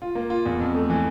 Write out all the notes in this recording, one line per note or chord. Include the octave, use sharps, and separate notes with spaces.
F4
A#3
F4
E2
F2
A3
E3